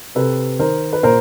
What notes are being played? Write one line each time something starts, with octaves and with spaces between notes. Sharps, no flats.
C3 A4 B4
D#3 A#4 C5
B4
A#2 A#4 C5